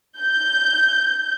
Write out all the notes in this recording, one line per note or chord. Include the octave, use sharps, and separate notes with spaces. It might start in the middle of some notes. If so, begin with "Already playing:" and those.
G6